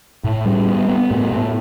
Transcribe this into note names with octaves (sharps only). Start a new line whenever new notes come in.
A2
G3
B3
B3
A2
A2